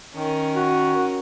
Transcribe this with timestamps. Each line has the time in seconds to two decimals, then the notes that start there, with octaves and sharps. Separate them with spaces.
0.15 D#3 C#4 A#4
0.55 F#4